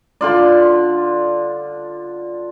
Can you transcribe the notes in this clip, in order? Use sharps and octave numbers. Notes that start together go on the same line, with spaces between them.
D3 F4 D5